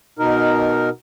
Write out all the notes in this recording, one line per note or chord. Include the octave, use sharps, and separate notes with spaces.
B2 D#4 A#4